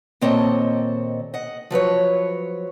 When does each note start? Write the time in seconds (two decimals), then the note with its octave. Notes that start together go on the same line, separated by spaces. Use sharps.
0.21 D#2 A#2 C4 A4 C#5 D#5
1.34 D#5 F#5
1.71 F3 F#3 B4 C#5